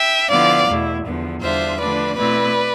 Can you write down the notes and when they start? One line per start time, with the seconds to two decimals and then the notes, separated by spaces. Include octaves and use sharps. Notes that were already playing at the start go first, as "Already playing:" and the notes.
Already playing: E5 G5
0.28 D3 F3 B3 E4 D5 F5
0.67 E2 B2 A3 E4
1.05 E2 D3 F3 B3
1.41 E2 D3 G3 D4 F4 C5 E5
1.79 D3 F3 A3 D4 B4 D5
2.17 B2 A3 C4 E4 B4 D5